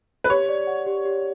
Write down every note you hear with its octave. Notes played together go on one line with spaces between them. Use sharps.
B4
G4 C#5
D5
F#5
G4
G4